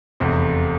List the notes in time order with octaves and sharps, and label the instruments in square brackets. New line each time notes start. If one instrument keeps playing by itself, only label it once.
[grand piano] F1 E2 C3 C5